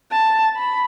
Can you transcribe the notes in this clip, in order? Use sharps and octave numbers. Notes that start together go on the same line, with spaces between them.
A5
B5